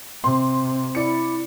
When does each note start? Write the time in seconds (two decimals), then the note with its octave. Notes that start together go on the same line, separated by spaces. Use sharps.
0.24 C3 C6
0.95 E4 D5 C#7